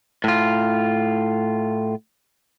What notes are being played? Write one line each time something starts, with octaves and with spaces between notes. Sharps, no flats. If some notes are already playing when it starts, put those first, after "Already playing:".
A2 F4